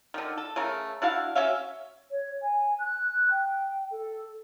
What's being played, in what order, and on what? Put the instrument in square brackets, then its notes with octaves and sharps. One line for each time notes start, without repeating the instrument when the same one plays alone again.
[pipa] D3 D#3
A4
C#3 A3 A#4
D4 E4 F#4 F5
C#4 F#4 E5 F5
[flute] C#5
G#5
F#6
G5
A4